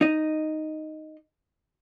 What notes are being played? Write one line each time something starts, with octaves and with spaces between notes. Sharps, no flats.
D#4 D#5